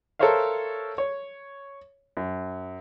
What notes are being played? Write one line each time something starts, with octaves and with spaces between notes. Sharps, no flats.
A4 A#4 C5 C#5 E5 F5
C#5
F#2